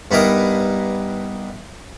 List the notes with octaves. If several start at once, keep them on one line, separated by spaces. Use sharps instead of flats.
G2 B3 D#4 E4 A#4 D#6